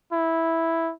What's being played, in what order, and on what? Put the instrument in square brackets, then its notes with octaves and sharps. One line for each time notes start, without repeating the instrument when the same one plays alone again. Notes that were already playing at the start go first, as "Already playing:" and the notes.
[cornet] E4